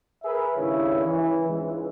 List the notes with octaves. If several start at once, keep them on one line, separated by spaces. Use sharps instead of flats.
G#4 A#4 B4 E5
G#1 G2 C#3 E4 C#5
E3
C#2 G#2 C#3 E3 G#3